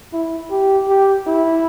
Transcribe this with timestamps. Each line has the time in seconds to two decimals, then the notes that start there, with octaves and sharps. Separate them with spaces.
0.13 E4
0.51 G4
0.88 G4
1.27 E4